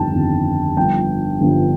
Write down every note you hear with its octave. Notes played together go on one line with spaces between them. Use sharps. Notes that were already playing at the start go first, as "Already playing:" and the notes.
Already playing: G1 F2 D#3 G5 A5
G1 F2 D#3
G1 G2 F3 G5
G1 G2 F3